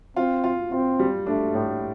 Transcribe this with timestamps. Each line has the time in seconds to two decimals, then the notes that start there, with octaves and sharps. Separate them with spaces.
0.16 C4 F4
0.44 F4
0.71 C4 F4
1.00 G3
1.26 A3 D4
1.54 A2